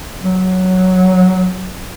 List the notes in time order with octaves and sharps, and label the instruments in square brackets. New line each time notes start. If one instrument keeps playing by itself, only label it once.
[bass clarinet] F#3